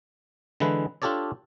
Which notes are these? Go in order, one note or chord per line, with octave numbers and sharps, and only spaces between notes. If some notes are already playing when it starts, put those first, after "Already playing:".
D3 E3 G#3 E4 B4
D4 F4 G4 A4 C#5 D5